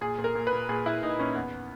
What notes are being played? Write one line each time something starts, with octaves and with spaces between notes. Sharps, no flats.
A#2 G#4
A#2
A#4
A#2
B4
A#2
A#2 G#4
A#2 E4
A#2 D#4
A#2 C#4
E2 B3